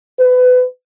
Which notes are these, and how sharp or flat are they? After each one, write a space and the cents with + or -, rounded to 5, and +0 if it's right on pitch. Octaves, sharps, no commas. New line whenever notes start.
B4 +30